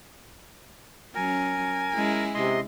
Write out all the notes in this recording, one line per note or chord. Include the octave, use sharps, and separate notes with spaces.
F#3 C#4 A#4 G#5
G#3 C#4 E4
C3 D#5 C6